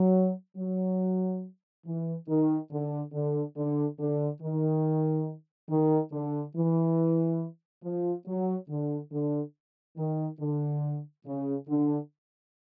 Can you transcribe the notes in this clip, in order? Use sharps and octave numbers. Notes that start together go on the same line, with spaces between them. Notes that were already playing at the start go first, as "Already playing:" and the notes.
Already playing: F#3
F#3
E3
D#3
D3
D3
D3
D3
D#3
D#3
D3
E3
F3
F#3
D3
D3
D#3
D3
C#3
D3